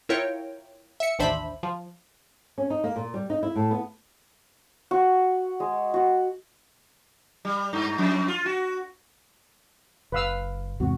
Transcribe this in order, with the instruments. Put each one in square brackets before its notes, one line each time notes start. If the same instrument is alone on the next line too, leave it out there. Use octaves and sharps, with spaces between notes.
[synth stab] E4 F4 A#4 C#5 G5
E5 C#7
A1 D#2 D4 C5 E5 B5
F3
[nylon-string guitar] C#4
D#4
A#3
A#2
G3
D#4
E4
A2
B3
[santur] F#4
G#3
F#4
[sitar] G3
G2
F2
F4
F#4
[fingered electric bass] F#1 [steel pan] B4 F5 E6
[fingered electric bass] E2 G#2 C3 [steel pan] F#4